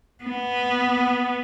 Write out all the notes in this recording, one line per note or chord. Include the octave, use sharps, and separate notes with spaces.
B3